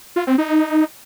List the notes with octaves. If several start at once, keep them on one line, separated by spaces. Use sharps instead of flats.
F4
C4
D#4